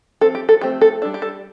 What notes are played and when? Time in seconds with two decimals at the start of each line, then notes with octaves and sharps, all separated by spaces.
0.21 F3 C4 A4
0.35 G4
0.49 A4
0.61 F3 A3 C4 G4
0.81 A4
1.02 G3 D4 A4
1.14 G4
1.22 A4